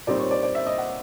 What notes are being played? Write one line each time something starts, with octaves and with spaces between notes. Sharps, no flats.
A#2 G3 C4 D#4 D5
C#5
D5
D5
E5
D#5
F#5